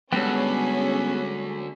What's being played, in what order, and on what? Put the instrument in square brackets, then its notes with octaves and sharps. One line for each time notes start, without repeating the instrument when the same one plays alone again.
[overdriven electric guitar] D2 [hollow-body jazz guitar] G3 G#3 G5 [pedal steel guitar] B3 A4 [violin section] C#4 G#4